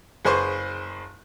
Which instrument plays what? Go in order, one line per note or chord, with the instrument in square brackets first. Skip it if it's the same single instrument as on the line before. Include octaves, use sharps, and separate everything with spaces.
[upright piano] F#1 G#4 B4 C5 C6 C#6